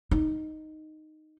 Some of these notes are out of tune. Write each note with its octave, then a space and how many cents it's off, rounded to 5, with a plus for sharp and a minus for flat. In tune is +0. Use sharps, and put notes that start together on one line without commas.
D#4 -5